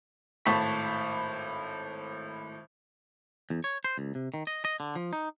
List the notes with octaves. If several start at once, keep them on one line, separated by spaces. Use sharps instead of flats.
G#1 A2 A5 B5 C#6 B6
E2
C#5
C5
C#2
C3
D#3
D#5
D#5
D3
F3
D#4